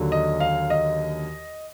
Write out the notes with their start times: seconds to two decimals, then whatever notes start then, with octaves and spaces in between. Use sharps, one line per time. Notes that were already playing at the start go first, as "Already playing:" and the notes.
Already playing: D#2 D3 F#3
0.12 D#5
0.40 F5
0.70 D#5